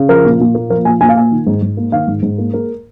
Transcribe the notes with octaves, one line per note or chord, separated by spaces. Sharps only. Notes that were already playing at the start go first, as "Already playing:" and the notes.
Already playing: C#3
F3 A#4
A#2
A#2
A#3
F3 A#4
A#2 G#5
A#2 G#5
F5
A#3 G#5
D#3
G#2
G#2
A#3
D#3 F5
G#2
G#2
A#3
G#3 A#4